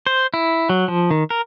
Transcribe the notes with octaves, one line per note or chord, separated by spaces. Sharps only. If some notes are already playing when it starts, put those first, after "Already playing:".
C5
E4
F#3
F3
D#3
A#4